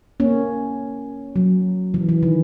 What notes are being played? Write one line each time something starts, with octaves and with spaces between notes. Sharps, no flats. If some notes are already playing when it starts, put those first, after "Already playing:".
A#3 C#4
F#3
E3
E3
D#3